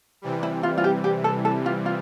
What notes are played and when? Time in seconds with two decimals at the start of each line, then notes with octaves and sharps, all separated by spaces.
0.22 C3 E3 G3
0.43 E4
0.63 F4
0.78 F4
0.84 G4
1.04 G4
1.24 A4
1.45 A4
1.66 F4
1.86 F4